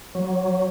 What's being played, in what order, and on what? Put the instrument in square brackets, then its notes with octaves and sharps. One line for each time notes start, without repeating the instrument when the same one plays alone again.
[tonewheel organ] F#3